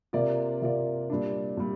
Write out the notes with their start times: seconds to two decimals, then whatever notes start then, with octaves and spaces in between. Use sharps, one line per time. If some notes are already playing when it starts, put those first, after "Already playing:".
0.13 C3 A#3 F4 D5
0.62 C3 A#3 F4 D5
1.10 A#2 G3 D4
1.57 A#2 G3